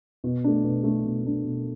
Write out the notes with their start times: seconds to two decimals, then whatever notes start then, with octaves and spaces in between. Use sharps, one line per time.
0.24 B2
0.44 A3 D4
0.64 B2
0.84 A3 D4
1.04 B2
1.23 A3 D4
1.44 B2